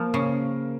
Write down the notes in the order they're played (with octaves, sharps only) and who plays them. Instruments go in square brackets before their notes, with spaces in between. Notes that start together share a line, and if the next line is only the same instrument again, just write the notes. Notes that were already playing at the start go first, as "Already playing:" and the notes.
Already playing: [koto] F3 [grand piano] A#3 A#4
[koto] C#3